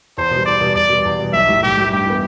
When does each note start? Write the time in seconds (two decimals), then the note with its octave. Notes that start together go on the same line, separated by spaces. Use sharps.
0.18 E2 C5
0.31 B2
0.36 G3
0.45 E2 D5
0.61 B2 G3
0.75 E2 D5
0.89 B2 G3
1.05 E2
1.19 B2 G3
1.33 B1 E5
1.48 A2 G3
1.62 B1 G4
1.78 A2 G3
1.92 G2 G4
2.06 E3 G3 B3